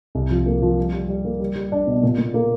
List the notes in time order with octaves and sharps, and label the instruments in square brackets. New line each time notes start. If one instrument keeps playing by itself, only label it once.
[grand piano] C2
F3
A#3
F3
G3
G3
G3
A#3
G3
G3
D4
B2
A#2
A#2
A#3